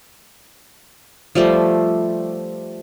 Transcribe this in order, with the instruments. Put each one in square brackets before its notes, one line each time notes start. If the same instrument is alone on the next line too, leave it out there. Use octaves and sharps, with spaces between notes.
[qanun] F3 G3 A3